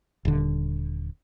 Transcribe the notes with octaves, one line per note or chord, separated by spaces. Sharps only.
D#1 D3